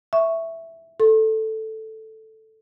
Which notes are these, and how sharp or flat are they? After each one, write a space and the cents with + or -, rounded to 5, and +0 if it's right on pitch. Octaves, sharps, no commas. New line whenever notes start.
E5 +0 C#6 +0
A4 +0 C6 +45